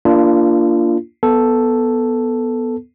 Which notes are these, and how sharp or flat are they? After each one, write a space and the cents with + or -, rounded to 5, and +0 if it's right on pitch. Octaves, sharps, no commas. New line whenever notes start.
A#3 +0 D4 +0 F4 -25
B3 +0 A4 +0